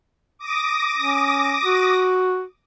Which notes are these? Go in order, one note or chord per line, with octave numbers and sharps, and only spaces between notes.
D6 D#6 A#6
C#4
F#4